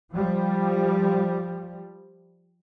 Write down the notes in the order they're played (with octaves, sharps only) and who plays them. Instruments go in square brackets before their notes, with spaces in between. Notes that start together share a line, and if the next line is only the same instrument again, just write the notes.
[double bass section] F3 G3